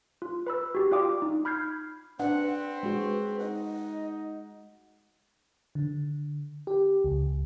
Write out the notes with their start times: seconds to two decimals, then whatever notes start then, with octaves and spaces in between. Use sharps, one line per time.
0.22 F4
0.47 B4 B5 E6
0.75 F#4 G4
0.91 F4 D5 F5 G5 D6 D#6
1.22 D#4
1.45 B5 F6 G6 G#6 C7
2.19 C4 D4 B4 F#5
2.83 G#3 F#4
3.40 D#4 D#5 F#5
5.75 D3
6.67 G4
7.04 C#2